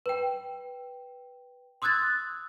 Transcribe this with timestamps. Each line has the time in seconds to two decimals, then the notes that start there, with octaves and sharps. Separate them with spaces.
0.06 B4 G5
1.82 C6 D#6 E6 F#6 G#6 A6